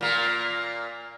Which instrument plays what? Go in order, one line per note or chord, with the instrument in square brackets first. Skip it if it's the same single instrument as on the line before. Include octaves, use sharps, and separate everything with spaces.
[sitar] A#2 A#3